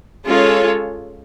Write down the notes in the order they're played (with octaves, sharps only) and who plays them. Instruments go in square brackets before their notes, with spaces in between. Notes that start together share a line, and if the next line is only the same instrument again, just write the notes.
[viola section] G#3 C#4 F4 A4 C#5